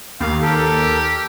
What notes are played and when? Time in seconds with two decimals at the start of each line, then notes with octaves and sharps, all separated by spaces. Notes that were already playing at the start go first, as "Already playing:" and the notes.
0.20 D#2 F5
0.41 G4 A4 A#4